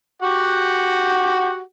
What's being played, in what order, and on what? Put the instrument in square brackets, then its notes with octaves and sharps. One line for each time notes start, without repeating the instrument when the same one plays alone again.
[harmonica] F#4 G4 F#5